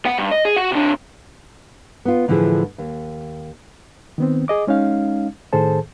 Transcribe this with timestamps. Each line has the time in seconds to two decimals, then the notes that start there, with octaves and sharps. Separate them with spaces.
0.06 B3 F#5
0.18 G2
0.31 D#5
0.45 G#4
0.56 F#4 F#5
0.72 C3 D4
2.05 B3 F4
2.28 A2 D3 E3 F3 E4 G#4
2.78 D#2
4.18 D#3 B3 C4
4.48 G#4 D#5 D6
4.67 G#3 C#4 D#4 F5
5.53 A2 D#3 G#4 A4 C5 A5